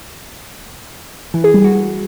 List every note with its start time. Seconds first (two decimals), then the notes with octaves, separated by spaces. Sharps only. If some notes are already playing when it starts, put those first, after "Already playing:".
1.34 E3
1.44 G#4
1.54 G3
1.64 F#4